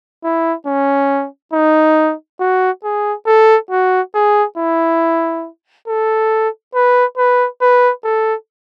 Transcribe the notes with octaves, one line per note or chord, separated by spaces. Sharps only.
E4
C#4
D#4
F#4
G#4
A4
F#4
G#4
E4
A4
B4
B4
B4
A4